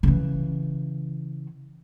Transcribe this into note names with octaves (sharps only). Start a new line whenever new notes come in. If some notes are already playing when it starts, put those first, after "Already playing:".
C#3 E3